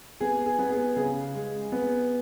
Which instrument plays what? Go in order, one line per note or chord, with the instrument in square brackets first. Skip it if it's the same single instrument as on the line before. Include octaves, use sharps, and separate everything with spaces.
[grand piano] B3 [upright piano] G#4
[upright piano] G#4
[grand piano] B3
[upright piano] G#4
[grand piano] C#3 [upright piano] G#4
[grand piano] G#3
B3